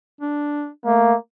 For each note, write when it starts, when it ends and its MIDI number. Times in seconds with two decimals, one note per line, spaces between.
0.21 0.69 62
0.85 1.14 57
0.85 1.15 58